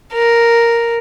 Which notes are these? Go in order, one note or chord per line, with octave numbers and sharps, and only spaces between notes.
A#4